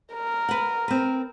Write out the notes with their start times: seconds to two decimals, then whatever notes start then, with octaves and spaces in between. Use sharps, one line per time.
0.13 A#4
0.49 B4 F#5
0.88 C4 B4